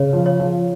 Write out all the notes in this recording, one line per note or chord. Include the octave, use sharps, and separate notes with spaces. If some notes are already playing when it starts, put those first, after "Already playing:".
Already playing: C#3 C#5
F3
C#5
F3